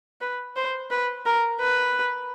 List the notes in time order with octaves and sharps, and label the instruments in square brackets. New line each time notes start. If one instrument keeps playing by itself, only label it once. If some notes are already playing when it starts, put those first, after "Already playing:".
[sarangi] B4
C5
B4
A#4
B4